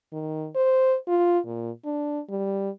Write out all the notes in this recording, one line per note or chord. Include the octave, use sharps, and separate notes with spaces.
D#3
C5
F4
A#2
D4
G3